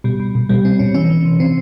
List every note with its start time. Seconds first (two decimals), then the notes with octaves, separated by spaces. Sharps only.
0.04 B2 G3
0.20 B2
0.35 B2
0.49 B2 G3
0.65 B2 C4
0.79 B2 C#4
0.94 E3 C#4
1.10 E3
1.25 C3
1.39 C3 C4